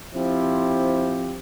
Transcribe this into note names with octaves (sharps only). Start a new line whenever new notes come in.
F3 C4 E4 G4 C5